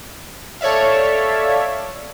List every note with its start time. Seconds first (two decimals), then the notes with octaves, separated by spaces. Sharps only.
0.61 A4 C#5 D5 E5 F5